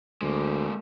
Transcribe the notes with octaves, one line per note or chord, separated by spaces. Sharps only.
D2 G#3 A#3